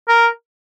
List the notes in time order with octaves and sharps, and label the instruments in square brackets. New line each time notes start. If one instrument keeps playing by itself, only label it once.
[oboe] A#4